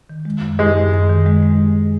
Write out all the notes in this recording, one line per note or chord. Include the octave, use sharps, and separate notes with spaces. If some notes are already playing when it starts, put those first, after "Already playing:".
D#3
G#3
F#2
F#2 G#3
F#2
F#2
D#3
G#3
G#3